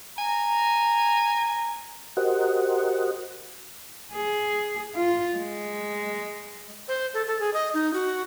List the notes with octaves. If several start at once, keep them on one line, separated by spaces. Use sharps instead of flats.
G#5 A#5
F#4 G4 A#4 C5 D#5 F#5
G#4
F4
G#3
C5
A4
A4
G#4
D#5
D#4
F#4